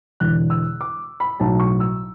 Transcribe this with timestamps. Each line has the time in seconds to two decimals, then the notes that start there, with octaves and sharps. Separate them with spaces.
0.20 E1 E2 D3 F#6
0.50 E6
0.81 D6
1.20 B5
1.40 B1 A2 F#3 A5
1.60 C#6
1.80 E6